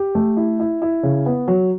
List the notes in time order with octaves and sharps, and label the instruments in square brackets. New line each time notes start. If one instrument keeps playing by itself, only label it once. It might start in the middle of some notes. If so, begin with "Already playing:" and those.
Already playing: [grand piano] G4
A3
E4
E4
E4
C#3
B3
F#3